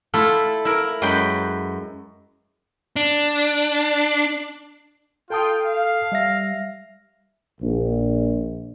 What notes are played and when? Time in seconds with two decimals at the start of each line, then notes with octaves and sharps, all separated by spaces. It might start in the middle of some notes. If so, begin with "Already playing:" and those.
0.14 A3 E4 F4 A4
0.65 E4 A#4
1.02 F#2 G#3 B4 G5
2.96 D4
5.30 F4 A4 G5 A5 D#6
5.65 F5
6.12 G3 E5 A#6
7.61 A#1